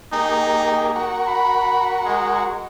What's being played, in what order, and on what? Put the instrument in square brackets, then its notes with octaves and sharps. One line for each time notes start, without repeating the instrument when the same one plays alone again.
[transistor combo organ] A#3 G4 G#4 [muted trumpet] D#4
[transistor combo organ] F#4 A#4 C#6
[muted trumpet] B5
G#3